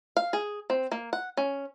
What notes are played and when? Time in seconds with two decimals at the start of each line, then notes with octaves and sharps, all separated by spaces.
0.17 F5
0.33 G#4
0.70 C4
0.92 A#3
1.13 F#5
1.37 C#4